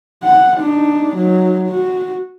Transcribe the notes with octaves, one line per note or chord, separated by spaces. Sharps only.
F#5
D4 D#4
F#3 D#4
F#4